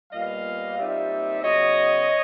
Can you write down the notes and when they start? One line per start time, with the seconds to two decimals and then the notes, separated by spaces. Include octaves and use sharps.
0.12 A#2 G3 B3 D#5 F5
0.77 A#2 G3 C4 D#4 D5 E5
1.42 C#3 F#3 B3 C#5 D#5